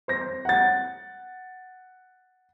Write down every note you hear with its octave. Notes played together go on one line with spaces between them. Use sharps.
C5 A#6
F#5 A6